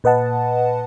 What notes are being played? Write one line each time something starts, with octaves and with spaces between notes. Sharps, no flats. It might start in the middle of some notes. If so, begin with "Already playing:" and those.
A#2 B4 D#5 F#5 A5